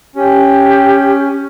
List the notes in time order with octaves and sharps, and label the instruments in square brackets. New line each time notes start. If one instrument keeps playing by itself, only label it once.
[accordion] C#4 [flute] G4